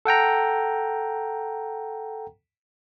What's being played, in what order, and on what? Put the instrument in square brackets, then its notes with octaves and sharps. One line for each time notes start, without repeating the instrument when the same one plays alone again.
[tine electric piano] A4 F#5 G5 A#5